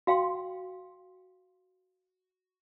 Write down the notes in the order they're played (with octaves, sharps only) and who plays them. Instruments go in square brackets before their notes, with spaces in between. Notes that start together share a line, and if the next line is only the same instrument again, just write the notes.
[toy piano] F#4 F5 G5 C6